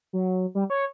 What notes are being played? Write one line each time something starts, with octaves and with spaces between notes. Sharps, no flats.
F#3
G3
C#5